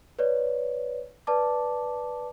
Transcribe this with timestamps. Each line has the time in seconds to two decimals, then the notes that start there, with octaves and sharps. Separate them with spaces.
0.19 B4 C#5 D5
1.27 B4 D5 A5 D6